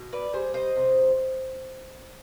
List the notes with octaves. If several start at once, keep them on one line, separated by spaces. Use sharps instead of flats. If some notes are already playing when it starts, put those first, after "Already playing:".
Already playing: B2
B4 D5
G3 G#4 C5
C5 D#5
C3